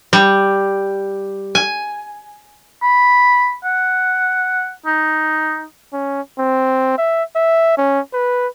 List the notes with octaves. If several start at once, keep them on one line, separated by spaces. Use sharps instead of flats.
G3
G#5
B5
F#5
D#4
C#4
C4
E5
E5
C#4
B4